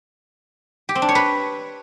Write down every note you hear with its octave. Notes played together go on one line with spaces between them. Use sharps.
G4
C4
D4
C#5
B4